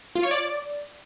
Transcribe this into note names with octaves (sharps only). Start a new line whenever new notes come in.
F4
C#5
D5